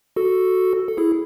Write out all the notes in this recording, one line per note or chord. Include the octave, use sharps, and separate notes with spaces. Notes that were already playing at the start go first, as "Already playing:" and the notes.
F#4 A4
A4
E4 G#4